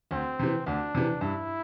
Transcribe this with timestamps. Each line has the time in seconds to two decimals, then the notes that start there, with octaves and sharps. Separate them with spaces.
0.11 D2 C4
0.39 C3 E3
0.66 D2 D4
0.95 C3 E3
1.21 G2 E4